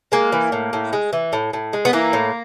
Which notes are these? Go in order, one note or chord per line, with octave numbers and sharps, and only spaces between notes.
G#3 A#3
E3
A2
A2
G#3
E3
A2
A2
G#3
B3
E3 A#3
A2